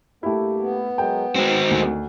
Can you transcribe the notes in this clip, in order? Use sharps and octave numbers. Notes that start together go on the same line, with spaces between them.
G2 A3 A#3 E4 G4
B3
F#3 G#3 A#4 G5
D#3 G#3 C4 F#4
D2